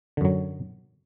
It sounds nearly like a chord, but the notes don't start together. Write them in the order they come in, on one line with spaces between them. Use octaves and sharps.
D3 F#2 F#3